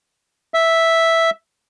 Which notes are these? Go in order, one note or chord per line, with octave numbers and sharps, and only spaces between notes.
E5